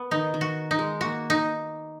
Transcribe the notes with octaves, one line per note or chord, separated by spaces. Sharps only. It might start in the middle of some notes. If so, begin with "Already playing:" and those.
Already playing: B3
D#3 D#4
D#3
F#4
D#4
G#3
A#3 F#4
D#4